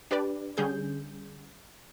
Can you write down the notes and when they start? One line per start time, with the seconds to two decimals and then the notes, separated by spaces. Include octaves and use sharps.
0.11 D4 G4 B4 D5
0.57 D3 G3 C#4 G#4 G6